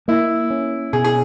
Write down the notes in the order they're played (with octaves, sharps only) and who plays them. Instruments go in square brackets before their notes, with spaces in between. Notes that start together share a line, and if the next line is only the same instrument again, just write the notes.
[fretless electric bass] A#3 [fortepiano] E4
[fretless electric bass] C#4
[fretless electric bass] B2 [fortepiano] G#4
[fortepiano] G#4